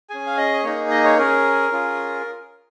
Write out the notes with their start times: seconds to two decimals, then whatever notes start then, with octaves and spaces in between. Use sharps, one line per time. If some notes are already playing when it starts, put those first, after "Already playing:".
0.10 C#4 G#4 G#5
0.26 F5
0.37 D#5
0.63 A#3 D#4 G#4 C#5
0.91 D#5
1.04 C#5
1.18 C#4 G#4 A#4
1.72 C#4 F4 G#4